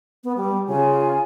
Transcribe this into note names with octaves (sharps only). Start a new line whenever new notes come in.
B3
G3
C#3 F4 G#5